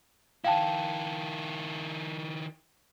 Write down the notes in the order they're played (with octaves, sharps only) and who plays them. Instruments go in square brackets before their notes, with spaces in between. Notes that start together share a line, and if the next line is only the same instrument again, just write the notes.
[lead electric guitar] D#3 E4 [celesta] F5 G5 A5